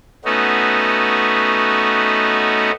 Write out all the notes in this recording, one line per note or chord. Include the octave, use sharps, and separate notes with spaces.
A3 B3 C#4 D#4 F#4